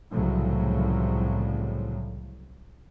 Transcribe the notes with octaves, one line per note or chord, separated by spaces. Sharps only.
C2 A2 C#3 F3 F#3